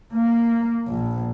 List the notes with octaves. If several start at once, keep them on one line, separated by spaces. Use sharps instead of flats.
A#3
A#1